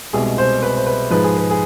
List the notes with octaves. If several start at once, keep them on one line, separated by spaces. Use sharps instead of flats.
C2 B2 G#3 G#4
C5
B4
C5
B4
G#2 F3 G#3 B4
G#4
B4
G#4